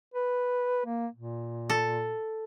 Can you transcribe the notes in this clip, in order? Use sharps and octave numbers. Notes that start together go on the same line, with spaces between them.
B4
A#3
A#2
A4